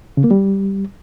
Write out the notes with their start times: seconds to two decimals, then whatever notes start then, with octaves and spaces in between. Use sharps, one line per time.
0.17 C#3
0.24 A#3
0.31 G3